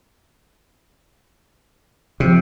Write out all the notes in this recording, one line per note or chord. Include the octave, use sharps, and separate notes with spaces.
C3 F3